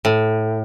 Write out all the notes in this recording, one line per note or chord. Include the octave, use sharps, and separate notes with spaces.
A2